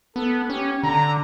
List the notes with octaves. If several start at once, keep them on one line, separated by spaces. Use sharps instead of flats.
B3 A4
C#4 G4
D3 A#5